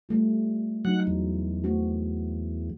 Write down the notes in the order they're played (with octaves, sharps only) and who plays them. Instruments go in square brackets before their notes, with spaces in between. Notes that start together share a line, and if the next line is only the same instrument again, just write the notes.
[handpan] G3 A3 F4
[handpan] F#3 D#4 [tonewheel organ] F#5
[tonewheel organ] E2
[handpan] A3 C4 F#4